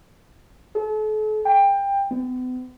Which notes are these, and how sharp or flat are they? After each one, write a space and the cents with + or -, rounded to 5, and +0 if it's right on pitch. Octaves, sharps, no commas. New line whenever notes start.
A4 -40
G5 +20
B3 +40